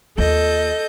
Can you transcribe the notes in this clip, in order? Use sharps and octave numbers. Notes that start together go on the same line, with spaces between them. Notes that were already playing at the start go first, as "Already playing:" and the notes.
D#2 F4 A4 D#5 G6